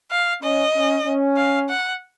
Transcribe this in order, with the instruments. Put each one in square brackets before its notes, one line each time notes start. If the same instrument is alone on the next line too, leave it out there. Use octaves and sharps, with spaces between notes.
[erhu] F5
[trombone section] C#4 [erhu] D#5
[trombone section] C#4
C#4
[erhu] F5
F#5